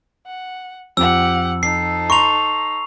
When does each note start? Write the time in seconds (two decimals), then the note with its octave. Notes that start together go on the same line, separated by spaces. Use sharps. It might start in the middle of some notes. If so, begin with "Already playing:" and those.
0.27 F#5
0.97 F2 G4 F#5 E6
1.63 D#4 A4 C7
2.10 A#5 C6 C#6 F7